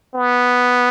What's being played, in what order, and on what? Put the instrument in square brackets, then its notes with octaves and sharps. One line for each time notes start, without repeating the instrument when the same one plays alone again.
[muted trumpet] B3